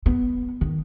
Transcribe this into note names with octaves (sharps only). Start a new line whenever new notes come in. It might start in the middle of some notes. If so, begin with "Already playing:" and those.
B3
D#3